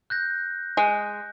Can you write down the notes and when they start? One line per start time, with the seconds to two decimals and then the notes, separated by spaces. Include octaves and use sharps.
0.10 F#6 G6 A#6
0.77 G#3